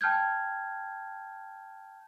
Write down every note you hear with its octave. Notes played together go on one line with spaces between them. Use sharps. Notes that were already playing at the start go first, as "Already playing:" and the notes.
G5 A5 F6 G6 G#6